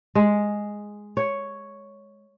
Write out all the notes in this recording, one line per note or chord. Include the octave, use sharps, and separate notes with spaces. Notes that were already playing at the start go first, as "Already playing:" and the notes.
G#3
C#5